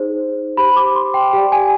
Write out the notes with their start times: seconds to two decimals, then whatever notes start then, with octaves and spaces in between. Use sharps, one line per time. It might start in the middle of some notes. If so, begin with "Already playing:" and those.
Already playing: D#4 G#4 C5
0.57 G4 C5 B5
0.76 D6
0.95 C6
1.14 G5
1.33 G4 D5 G5
1.52 G#5